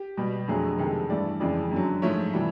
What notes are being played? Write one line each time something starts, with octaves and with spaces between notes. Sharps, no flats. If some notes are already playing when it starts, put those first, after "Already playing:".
Already playing: G4
B2 G3
F2 D3 F#3 A3 G#4
F2 C3 D#3 G#3 A4
G2 E3 A3 D5
F2 C#3 E3 G#3 D5
F#2 D3 F#3
G#2 F3 A3 C#5
C3 E3 G3